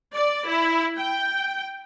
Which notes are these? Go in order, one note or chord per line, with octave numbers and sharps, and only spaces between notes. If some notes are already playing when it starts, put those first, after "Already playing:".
D5
E4
G5